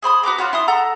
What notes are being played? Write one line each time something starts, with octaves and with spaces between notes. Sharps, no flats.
G#4 C5 B5 D#6
F#4 B4 A#5 D6
F4 F#4 C#5
E4 C6 D#6
A4 F#5 A#5